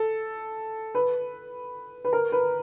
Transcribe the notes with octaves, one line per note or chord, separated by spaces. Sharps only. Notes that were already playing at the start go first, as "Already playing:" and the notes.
Already playing: A4
B4
B4
A#4
B4